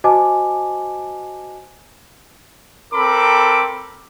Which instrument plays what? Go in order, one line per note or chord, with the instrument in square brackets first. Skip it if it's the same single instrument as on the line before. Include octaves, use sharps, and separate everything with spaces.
[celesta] F#4 C5 D#5 G#5 A5 D6
[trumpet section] C4 A4 A#4 B5 D6